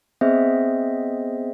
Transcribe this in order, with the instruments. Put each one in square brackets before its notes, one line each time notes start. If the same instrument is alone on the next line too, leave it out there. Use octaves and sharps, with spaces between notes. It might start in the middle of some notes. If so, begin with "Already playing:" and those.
[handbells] B3 C4 G#4 C5 D#5 E5